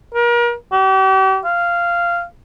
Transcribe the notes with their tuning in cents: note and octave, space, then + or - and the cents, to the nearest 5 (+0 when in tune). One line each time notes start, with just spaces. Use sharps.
A#4 +35
G4 -40
F5 -10